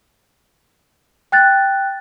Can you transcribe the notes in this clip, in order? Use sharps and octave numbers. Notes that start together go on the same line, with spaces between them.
G5 F#6 A6